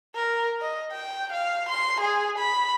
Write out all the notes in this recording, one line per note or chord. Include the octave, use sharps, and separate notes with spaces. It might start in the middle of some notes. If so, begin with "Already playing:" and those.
A#4
D#5
G5
F5
C6
G#4
B5